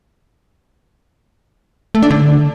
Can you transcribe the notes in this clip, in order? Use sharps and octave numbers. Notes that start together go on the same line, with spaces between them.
A3
D4
D3